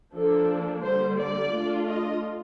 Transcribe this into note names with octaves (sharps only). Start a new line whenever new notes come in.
F3 A#3 D4 A4
D3 G3 A#3 C5
D5
A3 D4 F4
D#5